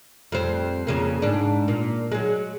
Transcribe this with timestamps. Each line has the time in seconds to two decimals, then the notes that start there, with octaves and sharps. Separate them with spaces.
0.32 F2 G3 C4
0.87 F2 C#3 A#3
1.22 G#2 D4
1.68 A#2
2.12 F#3 G#3